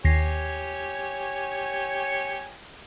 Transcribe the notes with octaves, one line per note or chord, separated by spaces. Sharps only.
D#2 G4 C#5 G#5 A#6 C7